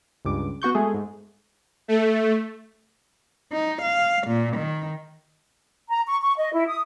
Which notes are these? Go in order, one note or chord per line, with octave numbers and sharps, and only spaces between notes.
C#2 G2 D6
B3 F#4 C#6 G6
G#3 A3 G#4
G#2
A3
D#4
F5
A#2
D#3
A#5
C#6
C#6
D#5
E4
D#6